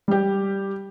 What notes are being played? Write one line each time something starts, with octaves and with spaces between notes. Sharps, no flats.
G3 G4